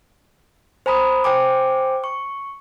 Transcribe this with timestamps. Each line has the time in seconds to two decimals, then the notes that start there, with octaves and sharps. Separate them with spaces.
0.86 C5 G#5 A#5 B5 D#6
1.24 C5 G5 G#5 D6
2.04 C#6